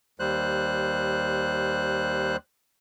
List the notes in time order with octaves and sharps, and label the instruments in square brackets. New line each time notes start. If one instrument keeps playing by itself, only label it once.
[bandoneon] D#2 G3 C5 F#6